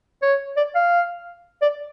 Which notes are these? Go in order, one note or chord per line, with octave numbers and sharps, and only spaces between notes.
C#5
D5
F5
D5